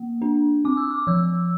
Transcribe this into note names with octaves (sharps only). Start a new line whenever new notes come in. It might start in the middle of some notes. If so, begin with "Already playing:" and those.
Already playing: A#3
D4
C4 D6
E6
D6
F3 E6